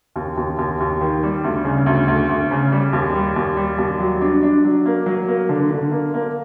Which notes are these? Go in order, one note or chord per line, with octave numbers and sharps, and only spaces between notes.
D#2
D#2
D#2
D#2
D#3
G3
D2
C#3
D2
D2
D2
C#3
G3
D#2
G3
D#2
G3
D#2
F#3
D4
D4
F#3
A#3
F#3
A#3
D3
D3
A#3
A#3